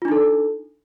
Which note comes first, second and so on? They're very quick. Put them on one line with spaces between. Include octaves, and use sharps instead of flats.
F4 D4 D#4 A4